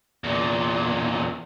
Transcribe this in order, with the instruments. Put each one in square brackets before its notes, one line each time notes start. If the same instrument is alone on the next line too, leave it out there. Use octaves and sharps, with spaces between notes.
[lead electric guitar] E2 A#2